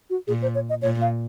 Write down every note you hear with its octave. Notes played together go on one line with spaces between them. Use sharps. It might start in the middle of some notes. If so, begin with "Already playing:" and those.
F#4
A#2 G#4
C5
C#5
D#5
A#2 C#5
F5